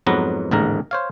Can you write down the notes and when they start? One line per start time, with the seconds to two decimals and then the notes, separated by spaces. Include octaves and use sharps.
0.06 F2 G#2 F#3 B3 B4 A#5
0.51 A1 D#2 G#2 D3 A#4 A#5
0.91 C5 C#5 F5